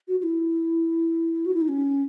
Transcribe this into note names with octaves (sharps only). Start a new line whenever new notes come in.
F#4
F#4
E4
F#4
E4
D#4
C#4